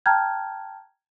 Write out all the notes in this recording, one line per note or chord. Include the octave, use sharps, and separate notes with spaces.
G5 A5 A#5 F6 G6 G#6